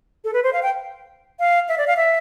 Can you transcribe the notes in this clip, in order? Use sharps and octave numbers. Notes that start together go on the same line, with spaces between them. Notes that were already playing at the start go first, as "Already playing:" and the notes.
A4
B4
C5
F5
G5
F5
E5
D5
F5
E5